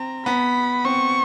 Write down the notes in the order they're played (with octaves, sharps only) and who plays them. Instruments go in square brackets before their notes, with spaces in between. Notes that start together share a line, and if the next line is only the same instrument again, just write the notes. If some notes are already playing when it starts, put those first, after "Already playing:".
Already playing: [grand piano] C4 [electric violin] A#5
[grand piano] B3 [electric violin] B5
[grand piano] C4 [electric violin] C#6